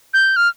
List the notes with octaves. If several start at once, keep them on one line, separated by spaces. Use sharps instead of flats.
G6
F6